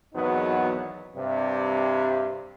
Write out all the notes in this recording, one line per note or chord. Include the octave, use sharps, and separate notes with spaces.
G#1 E2 F#3 B3 D#4
G2 C3